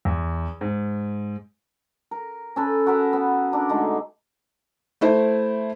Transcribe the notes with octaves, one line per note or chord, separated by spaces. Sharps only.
E2
G#2
A#4
C#4 A4 B4
F#4 A#4 B4 E5
B3
D4 A#4
D3 G#3 A3 D#4
A3 E4 C5